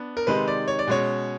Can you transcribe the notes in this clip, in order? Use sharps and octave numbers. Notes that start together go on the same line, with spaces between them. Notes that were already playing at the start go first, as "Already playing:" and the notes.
Already playing: B3 D4
A#4
C3 D#3 G#3 C4 D#4 B4
D5
C#5
D5
B2 G#3 C#4 C#5